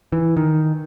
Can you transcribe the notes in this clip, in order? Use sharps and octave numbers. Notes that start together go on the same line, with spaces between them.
E3
D#3